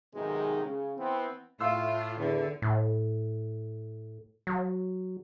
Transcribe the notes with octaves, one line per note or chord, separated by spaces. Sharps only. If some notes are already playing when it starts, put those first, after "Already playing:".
B1 G#2 C3 D#3 G#3
C#3
E3 B3 C4
A2 F4 F5 C6 E6
E2 D3
A2
F#3